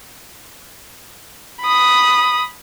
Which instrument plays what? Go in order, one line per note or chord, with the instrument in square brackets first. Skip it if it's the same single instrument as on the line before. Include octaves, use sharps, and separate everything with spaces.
[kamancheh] B5 D#6